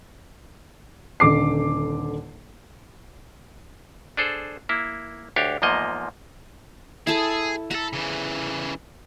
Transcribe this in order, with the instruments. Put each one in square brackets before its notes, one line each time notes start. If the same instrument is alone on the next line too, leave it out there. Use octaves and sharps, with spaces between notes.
[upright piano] D#1 D3 D6 C7
[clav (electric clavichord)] D4 G#4 A4 C5
A#3 E4
D2 D4 G4 C#5 F5
E2 G#2 F3 A#3 D#5
[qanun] E4 A4 A5 [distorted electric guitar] G#4
[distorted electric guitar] F#4 A4 [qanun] A#5 B5
[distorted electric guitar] C#3 E3